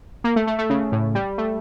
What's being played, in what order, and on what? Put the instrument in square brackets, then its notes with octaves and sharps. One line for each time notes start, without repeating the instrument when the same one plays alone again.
[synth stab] A#3
A3
A3
A3
C#3
A2
G3
A3